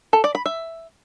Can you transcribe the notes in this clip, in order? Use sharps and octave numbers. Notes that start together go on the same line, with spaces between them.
A4
D5
B5
E5